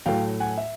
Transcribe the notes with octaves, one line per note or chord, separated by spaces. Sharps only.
A2 F#3 A3 F5 G5
F#5 G#5
E5